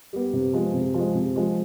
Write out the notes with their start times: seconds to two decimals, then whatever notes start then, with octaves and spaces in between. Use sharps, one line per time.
0.13 G3 B3
0.33 C3
0.53 F3 G#3
0.74 C3
0.94 F3 G#3
1.15 C3
1.36 F3 G#3